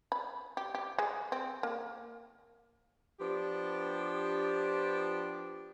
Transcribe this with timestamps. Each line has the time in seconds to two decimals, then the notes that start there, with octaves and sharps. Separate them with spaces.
0.12 B5
0.57 G4
0.75 G4
0.99 G#3
1.32 C4
1.63 A#3
3.19 F3 B3 D4 G4